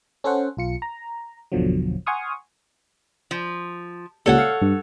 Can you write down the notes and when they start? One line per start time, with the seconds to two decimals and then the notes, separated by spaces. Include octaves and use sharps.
0.24 C#4 A4 C5 F#5
0.57 B1 F4 C#7
0.82 A#5
1.52 G#1 E2 B2 D3 F3 F#3
2.06 F#5 G#5 C6 C#6 D#6 F6
3.31 F3
4.26 C#2 A#2 G3 A4 C#5 F#5
4.38 F5
4.62 G2